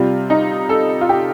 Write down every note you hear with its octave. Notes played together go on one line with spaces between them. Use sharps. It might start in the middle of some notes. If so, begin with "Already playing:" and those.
Already playing: C3 G3 F4
D#4
A4
F4
G4